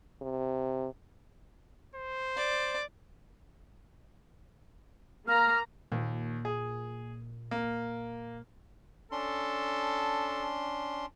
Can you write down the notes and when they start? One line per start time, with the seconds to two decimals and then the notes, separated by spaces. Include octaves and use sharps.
0.22 C3
1.95 C5
2.37 D5
5.28 A#3 A#5 F6
5.92 D#2 A#2
6.45 G#4
7.51 A#3
9.12 C#4 D4 A4 C6